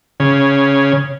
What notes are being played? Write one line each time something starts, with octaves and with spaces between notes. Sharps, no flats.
C#3